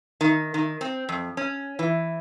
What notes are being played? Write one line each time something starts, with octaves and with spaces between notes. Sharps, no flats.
D#3
D#3
C4
F2
C#4
E3